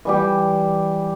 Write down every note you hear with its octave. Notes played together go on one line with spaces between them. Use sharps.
E3 G3 G4